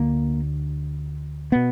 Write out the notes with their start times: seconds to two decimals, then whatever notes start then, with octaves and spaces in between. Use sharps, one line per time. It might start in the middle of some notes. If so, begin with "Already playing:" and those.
Already playing: D2 D3 A#3
1.52 B2 B3